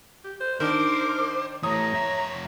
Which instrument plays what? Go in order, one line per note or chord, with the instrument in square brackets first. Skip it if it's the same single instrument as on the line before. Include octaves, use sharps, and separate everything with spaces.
[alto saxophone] G4
C5
[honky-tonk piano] D#3 D4 [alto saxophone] A#4 [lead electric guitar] C5 [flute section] D6
[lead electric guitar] E3 A3 [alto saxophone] C#5 [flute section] A#5 [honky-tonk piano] D#6
[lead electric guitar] F2 E5